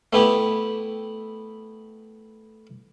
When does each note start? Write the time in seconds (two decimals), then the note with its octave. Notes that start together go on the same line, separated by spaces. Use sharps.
0.13 A3 B3 E4 G4